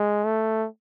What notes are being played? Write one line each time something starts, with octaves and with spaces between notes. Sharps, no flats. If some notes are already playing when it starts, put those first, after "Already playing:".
Already playing: G#3
A3